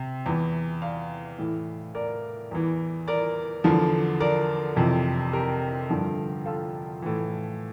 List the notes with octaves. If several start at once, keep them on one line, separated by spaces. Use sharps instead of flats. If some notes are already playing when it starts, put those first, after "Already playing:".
Already playing: C3
E2 E3
D5 F5
A2 E3
A#4 D5
E2 E3
A#4 D5
E2 D3 F3
A#4 D5
F2 C3 E3
G4 A#4
G2 D3 F3
F4 A4
A2 E3